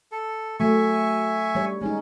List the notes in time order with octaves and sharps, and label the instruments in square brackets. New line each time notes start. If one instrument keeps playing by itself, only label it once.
[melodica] A4
[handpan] F#3 A3 [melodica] E5 G#5 C#6
[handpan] G3 C#5
[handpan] G#3 D#4 [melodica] C#4